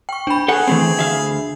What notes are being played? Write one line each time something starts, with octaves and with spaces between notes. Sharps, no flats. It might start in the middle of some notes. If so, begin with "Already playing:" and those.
G5 C#6
D4 B5
G#4 A4 F#5
E3 A3 C4
D2 E5 F5